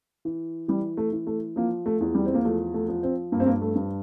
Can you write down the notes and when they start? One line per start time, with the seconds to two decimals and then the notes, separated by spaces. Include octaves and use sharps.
0.25 E3
0.68 E3 G3
0.97 A3
1.12 E3
1.27 A3
1.56 F3 A#3
1.86 A3
2.01 E2
2.15 G3
2.26 C4
2.34 A#3
2.44 F3 A3
2.74 A3
2.88 F3
3.03 C4
3.32 G2 A#3
3.40 C4
3.46 A#3
3.61 A3
3.76 G2